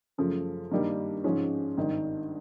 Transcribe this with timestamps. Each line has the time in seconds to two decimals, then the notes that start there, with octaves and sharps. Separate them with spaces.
0.18 F#2 C#3 F3 A3
0.72 G2 D#3 G3 A#3
1.24 G#2 F3 G#3 C#4
1.77 G#1 G2 D#3